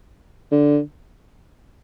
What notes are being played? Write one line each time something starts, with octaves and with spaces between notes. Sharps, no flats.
D3